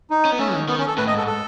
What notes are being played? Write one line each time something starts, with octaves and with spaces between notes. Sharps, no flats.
D#4
C#4
B3
A3 C#4
D#3
D#3 B3
C#4
A4
A2 B4
D#5
G#2 A4
A4